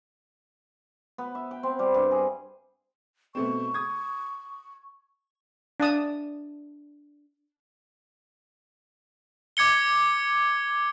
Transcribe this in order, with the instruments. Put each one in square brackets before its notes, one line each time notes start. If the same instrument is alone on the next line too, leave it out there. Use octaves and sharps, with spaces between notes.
[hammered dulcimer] B3
E5
G5
C4
G3
G2
G#4
[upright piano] B2 A3 C4 [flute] C#6
[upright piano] D#6 G#6
[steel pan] D4 A5 D#6
[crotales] D6 G#6 C#7 G7